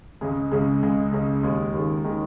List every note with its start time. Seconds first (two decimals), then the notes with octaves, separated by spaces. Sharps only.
0.21 C#2 C#3 G#3
0.51 C#2 C#3 G#3
0.83 C#2 C#3 G#3
1.12 C#2 C#3 G#3
1.43 D#2 D#3 G#3
1.73 D#2 D#3 G#3
2.04 D#3 G#3